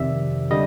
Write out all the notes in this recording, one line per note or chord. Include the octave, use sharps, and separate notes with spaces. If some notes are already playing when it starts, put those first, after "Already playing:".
Already playing: F2 C3 D#3 D5 E5
D3 G3 D#5